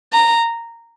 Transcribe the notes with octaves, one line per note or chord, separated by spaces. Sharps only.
A#5